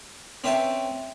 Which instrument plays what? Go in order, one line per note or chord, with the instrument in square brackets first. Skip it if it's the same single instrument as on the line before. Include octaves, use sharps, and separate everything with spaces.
[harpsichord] C4 C#4 B4 E5 G5 A5